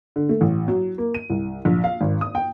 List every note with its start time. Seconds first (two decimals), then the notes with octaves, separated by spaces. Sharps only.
0.16 D3
0.29 A3
0.41 A1
0.68 F#3
0.98 A#3
1.14 D#7
1.30 C2
1.65 A#1
1.84 F5
2.01 G#1
2.21 D#6
2.35 G5